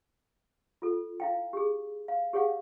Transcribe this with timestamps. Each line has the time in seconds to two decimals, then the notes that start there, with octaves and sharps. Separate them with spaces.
0.82 F4 A4
1.20 E4 F5 G5
1.53 G4 G#4
2.08 F5
2.33 G4 G#4 C#5 F5 F#5